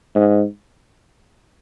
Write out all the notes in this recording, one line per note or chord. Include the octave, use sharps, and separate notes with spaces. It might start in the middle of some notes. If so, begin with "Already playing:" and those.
G#2